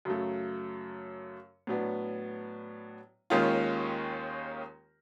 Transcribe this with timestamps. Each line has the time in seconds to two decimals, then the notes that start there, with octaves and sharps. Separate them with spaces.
0.05 F#2 C#3 F#3 A3
1.67 A2 F#3 B3 D4
3.30 D#2 D#3 G#3 C#4 F4